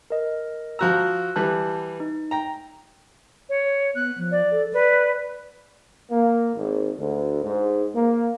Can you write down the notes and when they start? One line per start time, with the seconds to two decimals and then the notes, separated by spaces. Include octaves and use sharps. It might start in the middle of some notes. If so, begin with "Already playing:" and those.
0.10 A#4 D#5
0.79 F3 F#4 A#5 E6 F#6
1.36 E3 G3 A5 F#6 G6
2.00 D#4
2.31 G5 A#5
3.49 C#5
3.95 B3 F#6
4.18 F3
4.31 D5
4.52 A4
4.73 B4 D5
6.11 A#3
6.55 G#1
6.97 D2
7.42 G#2
7.95 A#3